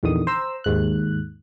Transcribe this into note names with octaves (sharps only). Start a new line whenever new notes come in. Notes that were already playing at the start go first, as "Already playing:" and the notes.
A#1 E2 D3 D#3 D#6
C5 A#5 E6
D#2 G#2 F#6